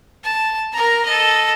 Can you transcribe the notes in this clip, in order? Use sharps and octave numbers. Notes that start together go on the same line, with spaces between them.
A5
A#4 A#5
A4 D#5